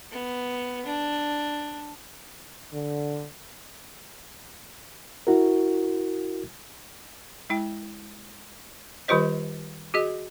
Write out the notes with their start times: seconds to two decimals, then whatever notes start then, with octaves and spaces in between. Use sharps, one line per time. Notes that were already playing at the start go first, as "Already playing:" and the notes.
0.11 B3
0.86 D4
2.73 D3
5.27 E4 F#4 A#4
7.50 G#3 E4 G5
9.08 D#3 G3 F4 G4 C5 D#5
9.94 F#4 G#4 D#5